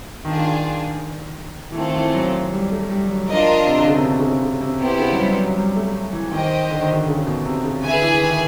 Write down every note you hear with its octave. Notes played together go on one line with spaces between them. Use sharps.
D#3 D4 F4 G#4
E3
D#3 A3 C4 F4 A4
E3
F#3
G3
A3
G3
F#3
F3 D4 F4 A#4 D#5
C3
D3
C#3
C3
B2
C#3
C3
C#3
C3
C3 B3 E4 G4 C5
C#3
F#3
G3
F#3
G3
A3
E3
D#3 G4 C5 D#5 G5
D3
D#3
D3
C#3
B2
C3
C#3
D3 G#4 B4 E5 G#5
E3
D#3